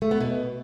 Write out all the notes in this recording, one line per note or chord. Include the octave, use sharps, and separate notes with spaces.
A3
B3
B2